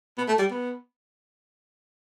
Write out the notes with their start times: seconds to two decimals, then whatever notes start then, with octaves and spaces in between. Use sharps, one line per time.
0.18 B3
0.28 A3
0.39 G3
0.51 B3